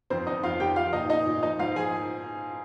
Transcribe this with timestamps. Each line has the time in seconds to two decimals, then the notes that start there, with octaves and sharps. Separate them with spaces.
0.10 F2 C4 C5
0.27 F2 D#4 D#5
0.43 F2 F4 F5
0.60 F3 G4 G5
0.76 F3 F4 F5
0.93 A#2 D#4 D#5
1.10 A#2 D#4 D#5
1.26 A#2
1.43 F3 D#4 D#5
1.59 G#2 F4 F5
1.76 F3 G#4 G#5